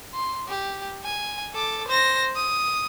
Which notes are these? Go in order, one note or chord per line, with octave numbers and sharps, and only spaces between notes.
C6
G4
G#5
A4 D6
C5 A#6
D#6